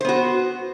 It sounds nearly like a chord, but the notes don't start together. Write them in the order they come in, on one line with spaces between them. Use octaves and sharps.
C5 B3 F#4